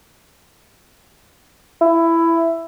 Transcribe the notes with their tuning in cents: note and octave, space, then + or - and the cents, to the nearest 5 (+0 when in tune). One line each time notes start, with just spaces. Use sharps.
E4 +10